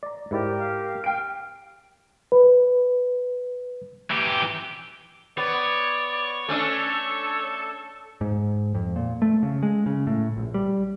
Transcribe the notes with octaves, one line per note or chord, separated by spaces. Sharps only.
D5 A#5
G#2 E4 G4 A#4 D5
F5
G5 D7
B4
E3 G4
B3 C#5 D5
A3 C#4 D4 A4
G#2
F2
A#2
A3
C#3
G#3
C#3
A2
A#1
G3